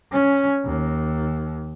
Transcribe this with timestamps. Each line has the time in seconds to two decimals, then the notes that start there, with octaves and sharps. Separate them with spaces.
0.12 C#4
0.65 D#2